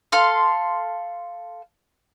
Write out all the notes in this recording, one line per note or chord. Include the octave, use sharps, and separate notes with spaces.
A4 F5 C6